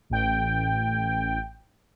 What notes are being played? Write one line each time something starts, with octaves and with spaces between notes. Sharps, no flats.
A1 G5